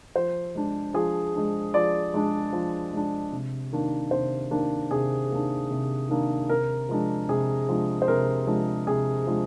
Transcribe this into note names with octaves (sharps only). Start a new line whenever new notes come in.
F3 C5
G#3 D4
F3 G#4
G#3 D4
F3 D5
G#3 D4
F3
G#3 D4
C3
D#3 A#3 D4
C3 C5
D#3 A#3 D4
C3 G#4
D#3 A#3 D4
C3
D#3 A#3 D4
C3 A#4
F3 G#3 D4
C3 G#4
F3 G#3 D4
C5
C3 A#4
F3 G#3 D4
C3 G#4
F3 G#3 D4